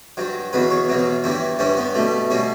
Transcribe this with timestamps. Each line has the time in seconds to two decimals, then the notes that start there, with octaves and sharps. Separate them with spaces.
0.17 G2 F#3
0.53 E2 B2 F#3 B4
0.71 C#5
0.89 E2 B2 F#3
1.24 G2 E3 G3 E4
1.59 G2 E3 G3 C#4
1.77 B3
1.94 B2 G3 A3
2.30 B2 G3 C#4